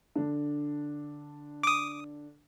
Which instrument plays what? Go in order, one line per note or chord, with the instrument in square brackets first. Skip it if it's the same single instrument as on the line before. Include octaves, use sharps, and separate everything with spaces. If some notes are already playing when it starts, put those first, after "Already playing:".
[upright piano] D3 D4
[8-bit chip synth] D6 D#6